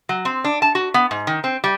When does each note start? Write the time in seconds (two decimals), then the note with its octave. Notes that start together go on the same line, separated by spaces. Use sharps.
0.09 F#3
0.25 C4
0.44 D4
0.62 A5
0.75 F#4
0.94 B3
1.11 G#2
1.27 D#3
1.44 C4
1.64 G3